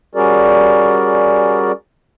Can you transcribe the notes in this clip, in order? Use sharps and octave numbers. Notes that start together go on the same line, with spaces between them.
G3 C#4 F#4 G#4 A#4 D5